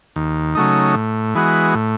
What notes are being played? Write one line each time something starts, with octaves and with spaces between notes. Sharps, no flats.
D#2
C#3 F#3 A3 D#4
A2
E3 G#3 B3 F#4
A2